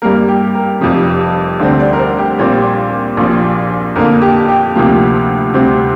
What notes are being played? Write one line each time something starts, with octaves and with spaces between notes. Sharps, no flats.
G2 G3 A#3 A#4
G4
A#4
F1 F2 C3 F3
D2 D3 G3 C4 D5
D5
A#4
C5
G4
A#1 A#2 G3 C4
A#1 A#2 F3
F2 D3 A#3 A#4
G4
G4
D2 C3 F3 A#3
D2 C3 G3 C4